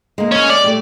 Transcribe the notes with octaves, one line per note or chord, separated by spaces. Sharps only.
G#3 A#3
C#4
D5
G3 A3